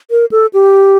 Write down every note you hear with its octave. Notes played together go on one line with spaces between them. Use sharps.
A#4
A4
G4